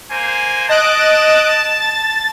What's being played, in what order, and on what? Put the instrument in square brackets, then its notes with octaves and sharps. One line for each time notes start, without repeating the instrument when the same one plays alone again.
[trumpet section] A#3 C5 G#5
[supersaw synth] D#5 F#6 D7 [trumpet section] A5
[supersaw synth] A6